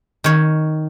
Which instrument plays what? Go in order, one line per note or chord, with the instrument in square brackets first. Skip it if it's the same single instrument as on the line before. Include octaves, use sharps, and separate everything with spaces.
[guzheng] D#3 C#5